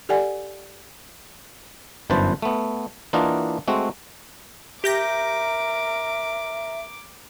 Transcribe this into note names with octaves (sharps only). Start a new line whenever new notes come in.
G4 A4 D5 F#5 G#5
G1 F#2 E3 B4 C5 A5
A3 B3
E3 A#3 D4 F4 D#5 F#5
G#3 A3 C4 F#4
G4 A#4 E5 D6 G6 A#6